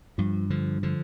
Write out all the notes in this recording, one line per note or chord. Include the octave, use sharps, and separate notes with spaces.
G2 F3
D3 F3
D3 F3